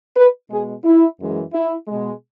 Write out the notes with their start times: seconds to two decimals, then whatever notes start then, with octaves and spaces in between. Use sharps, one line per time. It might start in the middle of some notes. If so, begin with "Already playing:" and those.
0.16 B4
0.49 B2 G#3 G#4
0.84 E4
1.18 F#2 E3 G#3
1.52 E4
1.87 B2 G#3